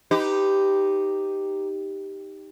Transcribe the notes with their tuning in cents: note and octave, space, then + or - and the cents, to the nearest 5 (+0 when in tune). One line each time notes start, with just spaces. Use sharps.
D#4 +0 G4 +0 B4 +30